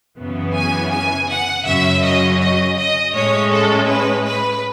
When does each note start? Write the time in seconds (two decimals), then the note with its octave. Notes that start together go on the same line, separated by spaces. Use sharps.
0.19 F#2 C#3 E3 B3
0.56 G#5
0.92 G#5
1.30 F#5
1.66 F#2 C#3 F#3 C#4 E5
2.03 D#5
2.41 D#5
2.78 D#5
3.14 A2 G#3 C#4 C#5
3.52 A4
3.89 B4
4.25 B4